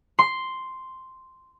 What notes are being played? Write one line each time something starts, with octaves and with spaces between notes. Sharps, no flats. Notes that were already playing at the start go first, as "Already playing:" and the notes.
C6